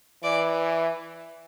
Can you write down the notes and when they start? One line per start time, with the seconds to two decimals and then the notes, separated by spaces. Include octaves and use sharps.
0.23 E3 D5